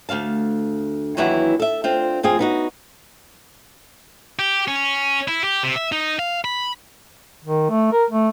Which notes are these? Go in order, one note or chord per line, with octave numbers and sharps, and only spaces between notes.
D2 F#3 F5 A5
D#2 E3 F#3 E4 B4 F#5
A4 E5
C4 D4 F4
F2 C4 F4 G#4
B3 D#4 F#4
G4
C#4
E4
G4
C3
E5
D#4
F5
B5
D#3
A3
A#4
A3